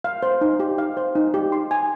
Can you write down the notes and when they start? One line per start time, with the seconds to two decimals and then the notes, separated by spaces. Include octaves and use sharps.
0.04 F5
0.23 C5
0.41 D#4
0.60 G4
0.78 F5
0.97 C5
1.15 D#4
1.34 G4
1.52 C6
1.71 G#5